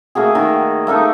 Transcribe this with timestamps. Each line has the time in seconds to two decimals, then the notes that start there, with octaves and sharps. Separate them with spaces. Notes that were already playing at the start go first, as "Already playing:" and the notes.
0.15 A3 A#3 F#4 G#4
0.35 D#3
0.87 A3 A#3 D#4 A4